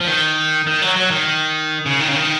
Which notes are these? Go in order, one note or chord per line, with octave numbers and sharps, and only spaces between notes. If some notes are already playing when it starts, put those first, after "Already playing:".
F3
D#3
D#3
F#3
F#3
D#3
C#3
D#3
C#3
D#3